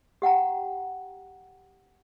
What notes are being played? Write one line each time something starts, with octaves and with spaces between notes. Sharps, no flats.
G4 F#5 G5 A#5